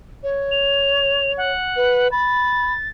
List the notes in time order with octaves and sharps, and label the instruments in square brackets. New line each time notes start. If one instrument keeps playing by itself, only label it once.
[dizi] C#5
[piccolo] F7
F#5
[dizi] B4
[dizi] B5 [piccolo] A6